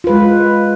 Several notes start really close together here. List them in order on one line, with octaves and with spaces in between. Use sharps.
F4 B4 G#3